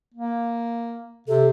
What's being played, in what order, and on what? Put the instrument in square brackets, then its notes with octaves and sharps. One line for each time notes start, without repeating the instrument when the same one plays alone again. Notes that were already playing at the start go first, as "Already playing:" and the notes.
[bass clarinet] A#3
[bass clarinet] C3 [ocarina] A4